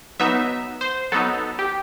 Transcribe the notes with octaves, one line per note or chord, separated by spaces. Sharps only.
F#3 B3 D#4 E5
C5
F#3 B3 D#4 A4
G4